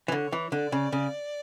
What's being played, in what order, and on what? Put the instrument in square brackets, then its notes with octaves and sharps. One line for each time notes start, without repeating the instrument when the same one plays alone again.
[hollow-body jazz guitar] E3
[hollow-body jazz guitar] D3 [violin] C#5
[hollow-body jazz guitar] E3
[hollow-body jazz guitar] D3 [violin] D5
[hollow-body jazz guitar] C#3
C#3